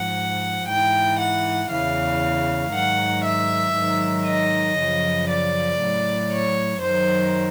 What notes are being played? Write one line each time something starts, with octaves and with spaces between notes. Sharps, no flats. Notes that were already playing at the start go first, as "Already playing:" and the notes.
Already playing: G#2 F3 F#5
G#2 E3 G5
F#5
E2 C#3 E3 F5
G#2 D#3 F#3 F#5
E5
G#2 D#3 F#3
D#5
F#2 C#3 F3
D5
A2 F#3
C#5
F#2 D#3 F#3 C5